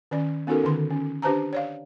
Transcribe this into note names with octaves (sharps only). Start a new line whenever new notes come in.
D#3 C#4 D5
B3 C#4 D#4 F#4 A4 A#4
D3 D#3 C6
C#4
D4 G4 B4 C5 A5 A#5
C#5 D5 F5